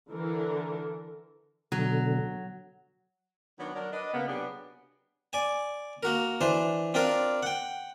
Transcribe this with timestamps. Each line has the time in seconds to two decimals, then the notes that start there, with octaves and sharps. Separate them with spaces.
0.11 D3 E3 A4 A#4
1.72 B2 D3 F#3
3.59 D#3 F#3 B3 D4
3.75 F#3 D4 A#4
3.92 D4 B4 D#5
4.13 C#3 A#3 B3
4.27 C3 F#3 B3 D4 G4 G#4
5.33 D5 G#5
6.03 A#3 F#4 A#4
6.41 E3 D4 C5
6.94 C4 D4 F4 A#4 D5
7.43 F#5 G5